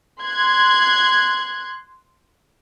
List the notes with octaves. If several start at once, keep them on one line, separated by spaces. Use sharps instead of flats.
C6 F#6 G#6